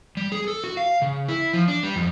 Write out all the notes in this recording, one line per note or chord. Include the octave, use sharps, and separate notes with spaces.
G3
G#4
A4
F#4
F5
C#3
E4
F3
D4
G3
F2